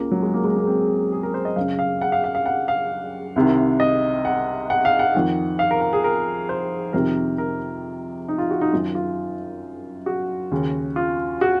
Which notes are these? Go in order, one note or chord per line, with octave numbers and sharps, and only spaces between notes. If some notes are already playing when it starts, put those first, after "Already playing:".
Already playing: C#2 C#3 A#3
F#3
G#3
A#3
G#3
A#3
C4
G#4
A#4
C5
D#5
F#2 C#3 F5
F5
F#5
F5
F5
F5
F#5
F5
C2 C3 D#3
D#5
F#5
F#5
F5
F#5
F2 D#3
F5
A#4
A#4
G#4
A#4
C5
F2 C3 D#3 A#4
A#4
D#4
F4
F#4
D#4
F#2 D#3 F4
F4
F#4
D#2 C#3
F4
F#4